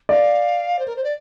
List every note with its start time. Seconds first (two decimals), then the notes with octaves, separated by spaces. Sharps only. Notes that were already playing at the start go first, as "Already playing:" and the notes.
0.09 D5 F5
0.79 C5
0.86 A#4
0.96 C5
1.03 D5